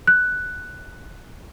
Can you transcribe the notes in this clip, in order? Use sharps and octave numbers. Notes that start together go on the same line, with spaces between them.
F#6